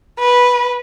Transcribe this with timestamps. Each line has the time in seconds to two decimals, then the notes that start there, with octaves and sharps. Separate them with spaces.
0.20 B4